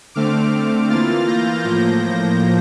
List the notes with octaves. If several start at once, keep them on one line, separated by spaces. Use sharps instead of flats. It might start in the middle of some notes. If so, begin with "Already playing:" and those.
D3 A3 C4 D6 F6
E3 A#3 F4 F6 A6
G6 A#6
A2 F3 A#3 G6 A#6